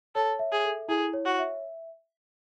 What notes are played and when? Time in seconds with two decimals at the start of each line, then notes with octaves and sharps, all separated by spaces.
0.15 A4 C#5
0.39 E5
0.52 G#4
0.65 A4
0.88 E4 G#4
1.13 C#5
1.26 F#4
1.39 E5